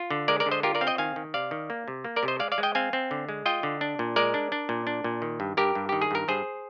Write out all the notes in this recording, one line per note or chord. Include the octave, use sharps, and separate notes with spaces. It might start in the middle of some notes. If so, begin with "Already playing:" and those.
Already playing: F4
D3
G#3 A#4 D5
A#4 D5
D3
C5 D#5
F4 G4 A#4
A#4 D5
C4 F5
D#5 G5
D#3 F5 G#5
D#3
C3 D5 F5
D#3
A#3
C3
A#3
A#4 D5
C3
C5 D#5
G#3 D5 F5
D5 F5
G#3
D#5 G5
C4 F5 G#5
C4
D3
G#3
F4 D#5 G5
D3
D4
A#2
G#3 A#4 D5
D4
D4
A#2
D4
A#2
D#3
G2
G2 G4 A#4
G2
D#3 G4
G#4
G2 A#4
G2 G#4 C5